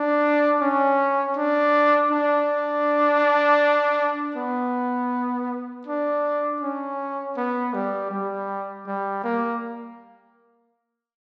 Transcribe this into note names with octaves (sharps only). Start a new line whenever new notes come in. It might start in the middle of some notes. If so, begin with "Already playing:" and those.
Already playing: D4
C#4
D4
D4
B3
D4
C#4
B3
G3
G3
G3
A#3